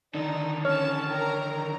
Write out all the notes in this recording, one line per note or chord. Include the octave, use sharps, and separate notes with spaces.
D3 D#3 D#4 D5
C#4 C#5 A5 F6
A#4 G5 A#5